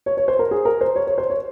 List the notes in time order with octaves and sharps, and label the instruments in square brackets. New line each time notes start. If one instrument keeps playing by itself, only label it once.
[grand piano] C#5
C#5
C5
A#4
G#4
A#4
C5
C#5
C#5
C5
C#5